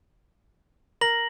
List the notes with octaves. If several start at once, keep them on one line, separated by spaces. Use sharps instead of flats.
A#4 A#6 F#7